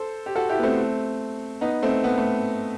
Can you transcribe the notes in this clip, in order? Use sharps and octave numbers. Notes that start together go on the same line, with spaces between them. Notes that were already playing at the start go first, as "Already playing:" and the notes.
Already playing: A4 C5
G4
F#4 A4
E4 G4
B3
A3 C4
B3 D#4
A3 C4
B3
A3